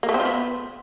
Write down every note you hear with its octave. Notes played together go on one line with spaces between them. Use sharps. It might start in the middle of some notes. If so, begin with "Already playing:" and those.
A#3
A3
C4
F4
B3